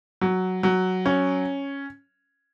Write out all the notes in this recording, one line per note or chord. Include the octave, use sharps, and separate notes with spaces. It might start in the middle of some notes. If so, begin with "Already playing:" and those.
F#3
F#3
C#4